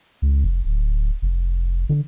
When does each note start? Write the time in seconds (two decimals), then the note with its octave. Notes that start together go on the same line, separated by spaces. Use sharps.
0.22 C#2
0.44 F1
0.65 D1
1.22 F1
1.89 D3